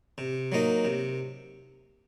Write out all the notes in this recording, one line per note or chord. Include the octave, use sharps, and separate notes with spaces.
C3
F#3 A#3 D#4
C3